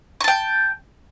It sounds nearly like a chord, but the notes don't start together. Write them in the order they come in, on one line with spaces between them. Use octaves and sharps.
C#6 A5 G5